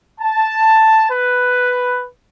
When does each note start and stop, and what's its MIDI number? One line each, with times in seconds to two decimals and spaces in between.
0.21 1.06 81
1.11 2.06 71